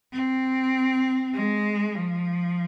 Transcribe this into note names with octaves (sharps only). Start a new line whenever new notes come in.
C4
G#3
F3